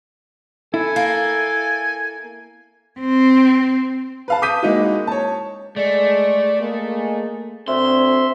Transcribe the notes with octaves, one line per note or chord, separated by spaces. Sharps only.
E4 A4 G#5
A#3
C4
B4 F5 A5
D6 D#6 G6 B6 D#7
G#3 A#3 D#4 E4 F#4
C#5 A5
G#3 A3 D5
G#3 A#3
D2 C4 E5 C6